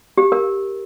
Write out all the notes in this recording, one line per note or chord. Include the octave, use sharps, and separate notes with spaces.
G4
A#4